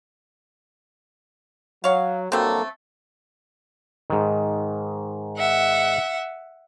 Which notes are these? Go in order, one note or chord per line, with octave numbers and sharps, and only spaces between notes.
F#3 C#5 F5
G2 F#3 A3 A#3 C4 A4
G#2 D#3
E5 F#5